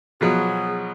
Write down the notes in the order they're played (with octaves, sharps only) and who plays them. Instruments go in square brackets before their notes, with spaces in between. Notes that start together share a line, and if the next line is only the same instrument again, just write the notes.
[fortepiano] B2 F3 F#3 [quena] G#4